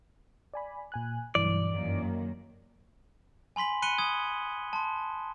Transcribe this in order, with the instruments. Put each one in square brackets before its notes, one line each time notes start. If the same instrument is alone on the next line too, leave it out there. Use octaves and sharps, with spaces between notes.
[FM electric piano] D5 G#5 B5
A#2 G#5 F#6
[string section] B1 [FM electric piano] G2 E3 [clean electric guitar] D5
[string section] F#2 D#3 A#3
[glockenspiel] G#5 B5 C6 B6 F#7
B5 F#6 C#7 D#7 G7
D#6 G#6 G7
A5 C6